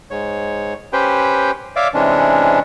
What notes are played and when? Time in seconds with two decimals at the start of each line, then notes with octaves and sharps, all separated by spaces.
0.10 G#2 C#5
0.93 C#4 G4 B4 C5 G5
1.76 C#5 D5 E5 F5 D6
1.94 C3 E3 G#3 C#4 D4